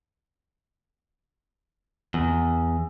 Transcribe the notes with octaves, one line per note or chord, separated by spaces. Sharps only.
E2